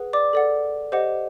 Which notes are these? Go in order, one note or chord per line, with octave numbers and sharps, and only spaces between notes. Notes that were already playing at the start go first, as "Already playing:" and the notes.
Already playing: G#4 B4 F#5
D5 D6
A4 D5 F#5
G4 C5 D#5 F#5